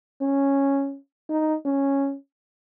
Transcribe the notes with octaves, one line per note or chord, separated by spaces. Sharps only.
C#4
D#4
C#4